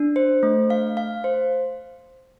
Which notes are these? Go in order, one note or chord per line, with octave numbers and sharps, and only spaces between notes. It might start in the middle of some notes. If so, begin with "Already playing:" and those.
Already playing: D4
C5
A3
F5
F5
C5